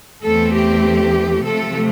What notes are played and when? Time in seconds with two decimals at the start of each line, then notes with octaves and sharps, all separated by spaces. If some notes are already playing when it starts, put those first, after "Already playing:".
0.24 E2 E3 A3 C4 A4
0.54 G4
1.44 C3 F3 A3 A4